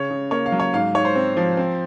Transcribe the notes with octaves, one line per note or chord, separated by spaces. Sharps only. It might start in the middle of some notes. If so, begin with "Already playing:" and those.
Already playing: C#3 C#5
C#3
A#3 C#5
F5
F#3
C#5
G#2 F5
G#2 C#5
C5
C4
F3
C4